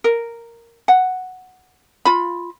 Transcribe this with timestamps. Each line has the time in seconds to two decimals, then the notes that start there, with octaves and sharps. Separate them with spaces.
0.04 A#4
0.88 F#5
2.05 F4 B5